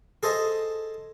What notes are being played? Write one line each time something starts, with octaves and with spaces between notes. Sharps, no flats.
G#4 A4 C5 D#5